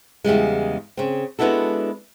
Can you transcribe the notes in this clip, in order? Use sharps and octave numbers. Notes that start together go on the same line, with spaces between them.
E2 C#3 G3 G#3
C#3 C4
G#3 B3 D4 E4 F#4 A4